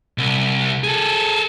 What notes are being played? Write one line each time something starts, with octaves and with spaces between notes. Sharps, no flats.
C2
G#4 A4